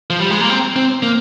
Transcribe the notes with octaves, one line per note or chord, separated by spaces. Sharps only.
F3
G3
G#3
A#3
C4
C4
A#3